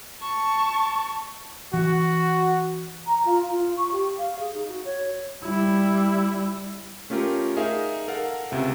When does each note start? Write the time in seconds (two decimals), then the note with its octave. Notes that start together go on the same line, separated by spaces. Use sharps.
0.20 A5 C#6
1.73 E3 F#4
3.06 A#5
3.25 F4
3.47 F4
3.77 C#6
3.92 G4
4.18 F5
4.39 G#4
4.54 D#4
4.68 F#4
4.85 C#5
5.44 G3 E4
7.10 A3 C#4 F4 G4 A#4
7.56 D#4 G#4 A#4 E5 F5
8.08 A4 A#4 F5 F#5
8.51 C#2 C3 E5